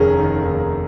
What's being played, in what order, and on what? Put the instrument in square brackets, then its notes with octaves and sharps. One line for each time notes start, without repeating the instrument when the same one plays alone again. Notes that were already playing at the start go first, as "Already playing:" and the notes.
Already playing: [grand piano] F1 D#2 D#3 C#4 [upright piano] G#4 A#4
[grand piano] D#3
D#2